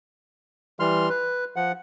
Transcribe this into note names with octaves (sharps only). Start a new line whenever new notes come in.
E3 G3 C6 F6
B4
F3 F#5